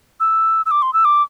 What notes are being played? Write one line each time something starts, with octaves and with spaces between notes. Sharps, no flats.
E6
E6
D6
C6
E6
D6